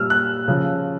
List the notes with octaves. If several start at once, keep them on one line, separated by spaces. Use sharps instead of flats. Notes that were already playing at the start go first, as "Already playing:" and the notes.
Already playing: A#2 G3 E6 F6
F#6
C#3 F3